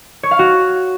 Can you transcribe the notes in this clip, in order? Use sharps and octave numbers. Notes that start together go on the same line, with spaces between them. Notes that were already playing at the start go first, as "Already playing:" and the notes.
C#5
F5
F#4